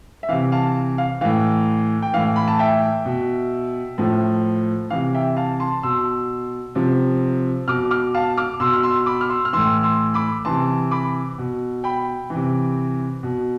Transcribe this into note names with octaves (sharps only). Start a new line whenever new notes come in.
E5
C3 E3 F5
F5 A5
F5
A2 E3 F5
G5
A2 E3 F5
B5
A5
E5 G5
B2
A2 F3
C3 E3 F5
E5 G5
F5 A5
A5 C6
B2 C6 E6
C3 F3
B2 D6 F6
D6 F6
F5 A5
D6 F6
B2 C6 E6
F6
C6 E6
B5 D6
F6
C6 E6
F6
A2 E3 C6 E6
C6 E6
B5 D6
C3 E3 A5 C6
B5 D6
B2
G5 B5
C3 E3
B2